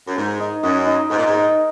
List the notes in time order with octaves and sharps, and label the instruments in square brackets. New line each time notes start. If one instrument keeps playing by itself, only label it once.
[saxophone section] F#2
[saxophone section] G#2 [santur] A#4
[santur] D#4
[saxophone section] F#2 [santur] D#5
[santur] D#4
[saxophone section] G#2 [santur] A#4
[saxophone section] A#2
G#2
[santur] D#4